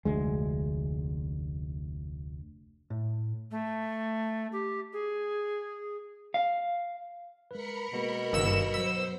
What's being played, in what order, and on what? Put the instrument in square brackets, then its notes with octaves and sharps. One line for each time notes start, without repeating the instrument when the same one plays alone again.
[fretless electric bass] F1 D2 G#3
[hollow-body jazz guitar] A2
[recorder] A3
G4
G#4
[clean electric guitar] F5
[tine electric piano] G#3 B4 [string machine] A#4 B5 C#7
[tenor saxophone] B2 [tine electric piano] G#3 A#3
[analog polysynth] G1 E6 E7 [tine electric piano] D#3 F5
[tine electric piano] F#3 B6 [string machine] C5 [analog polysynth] E6